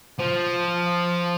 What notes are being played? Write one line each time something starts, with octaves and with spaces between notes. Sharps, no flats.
F3